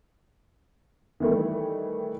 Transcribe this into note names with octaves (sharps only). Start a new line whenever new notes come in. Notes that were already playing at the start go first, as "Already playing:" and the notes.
D#3 E3 G3 A3